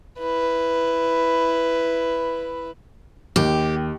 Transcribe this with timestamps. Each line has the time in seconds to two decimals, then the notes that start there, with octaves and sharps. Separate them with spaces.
0.19 E4 B4
3.36 D#2 G4